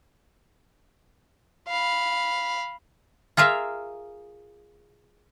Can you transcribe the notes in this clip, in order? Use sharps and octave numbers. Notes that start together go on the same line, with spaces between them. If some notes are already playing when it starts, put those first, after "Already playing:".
F5 B5
F4 G#4 A#4 E5 F5